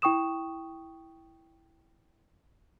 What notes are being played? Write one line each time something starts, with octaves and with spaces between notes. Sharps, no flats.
E4 G5 C#6 D#6 E7